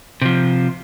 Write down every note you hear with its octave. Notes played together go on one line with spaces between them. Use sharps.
C3 F3